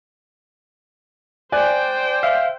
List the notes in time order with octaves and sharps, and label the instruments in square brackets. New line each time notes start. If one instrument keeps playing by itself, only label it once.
[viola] C5 G5 [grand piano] D5 G#5 F#6
[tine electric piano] E5 F5